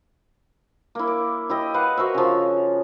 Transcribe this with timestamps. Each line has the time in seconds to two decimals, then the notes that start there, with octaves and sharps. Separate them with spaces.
0.95 A#3 E4
1.07 D6
1.50 E4 G4 D#5
1.74 B4 F5 F#5
1.97 F#4 A#4 C5 E5
2.14 C#3 F3